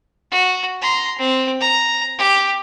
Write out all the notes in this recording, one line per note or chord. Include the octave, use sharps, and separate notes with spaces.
F#4
A#5 C6
C4
A#5
G4